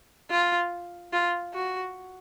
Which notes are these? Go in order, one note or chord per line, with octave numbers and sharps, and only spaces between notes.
F4
F4
F#4